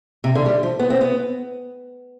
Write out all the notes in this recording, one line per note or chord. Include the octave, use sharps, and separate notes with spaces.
C3
D3
G3
F3
B3
C4
B3